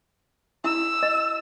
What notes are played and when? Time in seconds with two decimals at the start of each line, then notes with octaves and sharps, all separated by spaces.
0.64 E4 E6
1.03 D#5